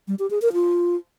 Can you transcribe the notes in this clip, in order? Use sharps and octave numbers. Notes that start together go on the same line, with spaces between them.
G3
G4
G#4
A#4
F4